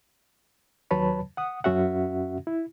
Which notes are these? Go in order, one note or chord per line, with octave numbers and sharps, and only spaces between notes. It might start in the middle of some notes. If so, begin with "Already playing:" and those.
D#2 F#3 B4 C#5 A5 B5
F#5 D#6
F#2 C#4 F#4 E5 F#5
E4